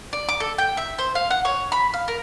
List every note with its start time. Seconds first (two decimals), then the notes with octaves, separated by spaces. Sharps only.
0.13 D5
0.29 D6
0.40 A4
0.58 G5
0.77 E5
0.99 C5
1.15 F5
1.30 F#5
1.45 C#5
1.72 B5
1.94 F5
2.08 A#4